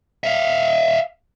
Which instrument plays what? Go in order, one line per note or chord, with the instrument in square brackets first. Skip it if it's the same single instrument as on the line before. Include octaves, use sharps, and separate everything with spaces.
[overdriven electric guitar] E5 F5